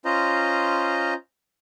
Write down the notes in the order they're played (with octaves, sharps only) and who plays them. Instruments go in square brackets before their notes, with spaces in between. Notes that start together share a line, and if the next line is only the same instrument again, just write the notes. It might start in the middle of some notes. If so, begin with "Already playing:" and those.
[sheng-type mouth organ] C#4 F4 C5 D#5 A#5